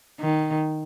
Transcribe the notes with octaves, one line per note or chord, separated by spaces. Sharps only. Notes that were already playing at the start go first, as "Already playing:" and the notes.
D#3